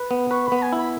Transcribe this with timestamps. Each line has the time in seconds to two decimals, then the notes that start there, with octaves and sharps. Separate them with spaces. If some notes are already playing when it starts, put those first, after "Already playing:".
Already playing: B4
0.11 B3
0.31 B4 C#6
0.46 B5
0.52 B3
0.62 G#5
0.73 E4 B5